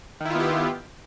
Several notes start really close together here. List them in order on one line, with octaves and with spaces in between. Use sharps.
D#3 E4 F4 B3 G4